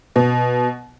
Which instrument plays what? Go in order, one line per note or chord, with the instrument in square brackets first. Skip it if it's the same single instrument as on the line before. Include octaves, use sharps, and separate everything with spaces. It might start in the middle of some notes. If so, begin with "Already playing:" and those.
[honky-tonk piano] B2